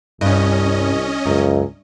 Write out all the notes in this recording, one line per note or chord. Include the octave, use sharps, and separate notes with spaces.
C2 G2 C#4 D#5
C#2 F#2